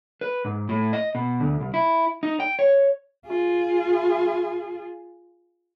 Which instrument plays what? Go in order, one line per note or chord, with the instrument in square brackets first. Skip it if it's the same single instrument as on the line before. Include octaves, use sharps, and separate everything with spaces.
[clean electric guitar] B4
G#2
A2
D#5
B2
D2
C2
E4
D#4
G5
C#5
[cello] F4 G#4